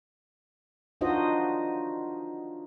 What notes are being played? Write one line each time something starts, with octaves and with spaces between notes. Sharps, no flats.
D4 D#4 F4 F#4 C5 D#5